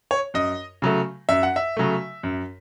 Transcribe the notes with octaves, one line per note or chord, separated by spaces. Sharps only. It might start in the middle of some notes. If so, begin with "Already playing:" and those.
C#5
F#2 D#5
C#3 F#3 A3
F#2 E5
F#5
E5
C#3 F#3 A3
F#2